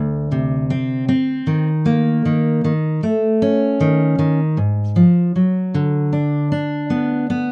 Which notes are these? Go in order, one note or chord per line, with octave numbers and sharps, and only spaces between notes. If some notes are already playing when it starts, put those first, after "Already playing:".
Already playing: D2
C3
C4
C4
D#3
A#3
D#3
D#3
A3
C#4
D#3
D#3
G#2
F3
F#3
D3
D4
D4
B3
B3